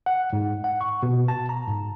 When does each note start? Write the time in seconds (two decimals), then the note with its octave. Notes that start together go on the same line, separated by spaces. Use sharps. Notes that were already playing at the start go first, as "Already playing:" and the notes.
0.06 F#5
0.33 G#2
0.64 F#5
0.81 C#6
1.03 B2
1.28 A5
1.49 A#5
1.68 G#2